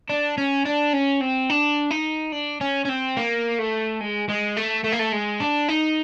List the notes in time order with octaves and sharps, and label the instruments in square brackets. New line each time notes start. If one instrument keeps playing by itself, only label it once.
[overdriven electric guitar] D4
C#4
D4
C#4
C4
D4
D#4
D4
C#4
C#4
C4
A#3
A3
G#3
G#3
A3
A3
A#3
A3
G#3
D4
D#4